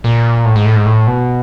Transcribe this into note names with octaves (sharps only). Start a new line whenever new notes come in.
A#2
A2
G#2
A2
G#2
A2
B2